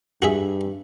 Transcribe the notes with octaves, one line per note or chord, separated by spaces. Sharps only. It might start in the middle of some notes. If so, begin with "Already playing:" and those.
G2 F#4 G#4 E5